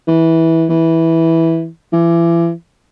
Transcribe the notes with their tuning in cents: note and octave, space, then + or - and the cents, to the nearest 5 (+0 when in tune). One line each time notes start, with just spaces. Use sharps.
E3 -15
E3 -10
E3 +35